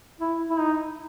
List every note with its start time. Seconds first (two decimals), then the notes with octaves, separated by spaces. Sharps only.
0.21 E4
0.50 E4
0.59 D#4